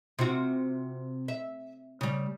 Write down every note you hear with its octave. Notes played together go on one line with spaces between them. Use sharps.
C3 F4 F#4
E5
C#3 G3